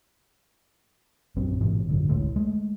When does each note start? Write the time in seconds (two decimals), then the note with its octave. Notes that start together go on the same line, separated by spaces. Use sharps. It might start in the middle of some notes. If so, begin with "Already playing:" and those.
1.36 A#1 F#2 F#3 C4
1.61 A1 G#2 B2 E3
1.89 A#1 F#2 D3
2.08 F1 C#2 A2
2.36 G#3 A3